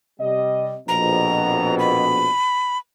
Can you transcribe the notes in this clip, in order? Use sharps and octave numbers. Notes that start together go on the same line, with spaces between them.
C3 G3 D#5
A#1 F2 B2 A#5
B5